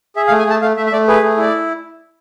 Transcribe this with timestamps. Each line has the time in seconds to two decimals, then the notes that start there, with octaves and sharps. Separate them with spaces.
0.16 G#4 E5
0.28 F5
0.31 A3
0.39 G#5
0.47 A3 A5
0.62 A3 F5
0.77 A3 E5
0.87 E5
0.92 A3 D5
1.08 G#4 B4
1.23 A3
1.37 E4 D5